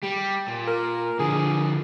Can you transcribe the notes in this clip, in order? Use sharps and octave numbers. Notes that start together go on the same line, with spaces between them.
G3 G4
A#2
A#4
D3 F3 G#4